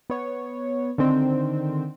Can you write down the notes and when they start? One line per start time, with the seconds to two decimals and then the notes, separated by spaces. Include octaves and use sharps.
0.10 B3 C#5
0.98 D3 D#3 C4